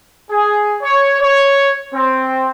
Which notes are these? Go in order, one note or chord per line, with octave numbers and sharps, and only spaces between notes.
G#4
C#5
C#5
C4